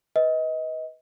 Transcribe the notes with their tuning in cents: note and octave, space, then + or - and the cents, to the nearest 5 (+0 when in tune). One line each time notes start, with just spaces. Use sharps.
B4 +0 D#5 +25